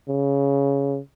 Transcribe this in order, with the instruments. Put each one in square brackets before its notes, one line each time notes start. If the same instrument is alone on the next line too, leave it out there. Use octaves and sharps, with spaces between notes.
[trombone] C#3